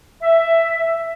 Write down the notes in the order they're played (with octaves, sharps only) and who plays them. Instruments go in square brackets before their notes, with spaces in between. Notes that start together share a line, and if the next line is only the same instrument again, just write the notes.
[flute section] E5